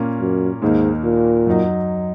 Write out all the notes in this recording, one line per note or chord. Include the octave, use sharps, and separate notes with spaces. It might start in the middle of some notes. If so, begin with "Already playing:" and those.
Already playing: A#2 A#3 C#4
F#2
D#2 G#2 D#3 A#3
A#2
F#2 F#3 D#4